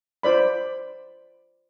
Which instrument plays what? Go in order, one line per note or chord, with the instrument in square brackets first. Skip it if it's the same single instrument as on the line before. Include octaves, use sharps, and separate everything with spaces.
[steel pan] F4 C5 D5 B5